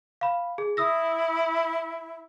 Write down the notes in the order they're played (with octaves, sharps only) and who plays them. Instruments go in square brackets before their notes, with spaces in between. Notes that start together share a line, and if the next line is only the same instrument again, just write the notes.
[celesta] F5 B5
G#4
[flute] E4 [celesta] D#6 E6 A#6